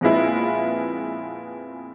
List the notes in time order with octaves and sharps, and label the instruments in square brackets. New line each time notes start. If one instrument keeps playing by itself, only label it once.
[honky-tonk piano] F2 A#2 G#3 B3 E4 F4